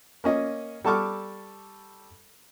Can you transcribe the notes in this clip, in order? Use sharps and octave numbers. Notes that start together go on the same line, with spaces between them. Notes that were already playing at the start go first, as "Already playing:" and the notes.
A#3 C#4 D#5
G3 A4 A5 C#6 D6 F6